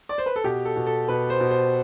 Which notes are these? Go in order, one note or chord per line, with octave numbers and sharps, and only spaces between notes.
D5
C5
B4
A4
B2 G4
A4
B2
A4
B2 B4
C5
B2
C5